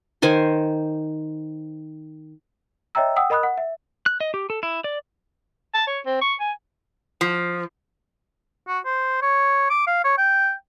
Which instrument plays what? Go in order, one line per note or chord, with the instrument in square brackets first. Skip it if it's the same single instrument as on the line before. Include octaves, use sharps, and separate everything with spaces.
[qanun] D#3 C5 G#5 C6
[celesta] C#5 D#5 E5 G5 A#5 E6
F#5 G5 D#6 E6
A#4 D#5 B5 D#6 F#6
F#5
E5
[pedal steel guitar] F#6
D#5
G4
A4
E4
D5
[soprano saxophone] A5
C#5
C4
C#6
G#5
[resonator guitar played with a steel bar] F3
[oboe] F#4
C5
C#5
D6
F5
C#5
G5